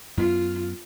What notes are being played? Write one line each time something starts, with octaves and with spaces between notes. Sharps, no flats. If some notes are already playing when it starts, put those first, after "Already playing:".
F#2 B3 F4